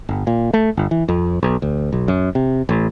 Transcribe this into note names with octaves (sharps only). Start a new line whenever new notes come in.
G1
A#2
A3
G1
E3
F2
B1
D2
B1
F#2
C3
A1